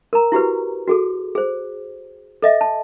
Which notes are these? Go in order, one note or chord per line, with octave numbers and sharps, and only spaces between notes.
A#4 A#5
E4 F#4 G4 B4
F#4 G#4 A4
G#4 C5
A4 D#5 E5
A5